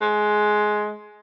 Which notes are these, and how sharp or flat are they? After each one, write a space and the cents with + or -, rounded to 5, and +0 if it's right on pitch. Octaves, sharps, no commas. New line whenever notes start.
G#3 +15